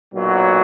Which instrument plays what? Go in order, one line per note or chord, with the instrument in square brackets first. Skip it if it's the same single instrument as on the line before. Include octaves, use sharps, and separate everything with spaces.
[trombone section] B1 A#2 F#3